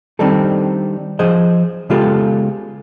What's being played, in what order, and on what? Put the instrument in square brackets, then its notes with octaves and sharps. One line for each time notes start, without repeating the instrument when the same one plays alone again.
[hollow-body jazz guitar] D#3 G3 C4 D4 D#4 A4
F3 G#4 C5 D#5
C#3 G#3 B3 F4 G4 A4